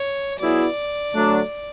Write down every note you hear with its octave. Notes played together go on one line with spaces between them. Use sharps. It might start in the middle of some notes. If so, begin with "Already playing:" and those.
Already playing: C#5
F#3 B3 E4 G#4 D5
D3 F#3 A3 D4